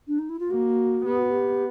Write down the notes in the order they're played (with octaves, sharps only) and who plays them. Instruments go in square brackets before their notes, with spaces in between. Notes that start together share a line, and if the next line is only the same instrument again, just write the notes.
[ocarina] D4
D#4
E4
F4
[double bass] A#3 [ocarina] F#4
[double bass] B3 [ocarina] G4
[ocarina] F#4
G4